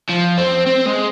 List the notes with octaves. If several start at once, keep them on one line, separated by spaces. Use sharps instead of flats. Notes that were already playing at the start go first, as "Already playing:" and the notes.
F3
C4
C4
G#3